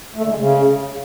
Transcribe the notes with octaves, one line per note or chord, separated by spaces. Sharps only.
A3
D3
G#3
C#3